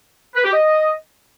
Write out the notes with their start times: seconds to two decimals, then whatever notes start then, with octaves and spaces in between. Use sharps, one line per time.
0.35 B4
0.44 G4
0.53 D#5